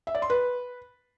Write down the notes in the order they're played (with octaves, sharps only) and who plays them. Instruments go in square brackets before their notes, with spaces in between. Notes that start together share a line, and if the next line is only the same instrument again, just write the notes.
[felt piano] E5
D5
C6
B4